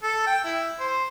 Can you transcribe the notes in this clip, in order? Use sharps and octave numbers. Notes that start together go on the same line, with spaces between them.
A4
G5
E4
C5